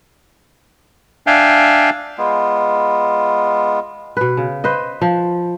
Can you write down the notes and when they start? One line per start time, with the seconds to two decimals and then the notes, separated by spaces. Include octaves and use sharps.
1.27 D4 E5 F5 G5 G#5
2.18 G#3 B3 F4
4.17 B2 B4
4.37 C#3
4.64 B4 C5 D#5
5.02 F3